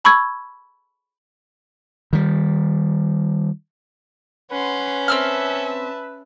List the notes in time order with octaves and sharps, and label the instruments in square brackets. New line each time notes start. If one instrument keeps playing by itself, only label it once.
[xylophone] A5 B5 C#6 E6 G#6
[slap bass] D#3 G3
[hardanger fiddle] C#4 [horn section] B4 [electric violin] F#5 C6
[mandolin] C4 E6 F6 [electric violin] E5 A5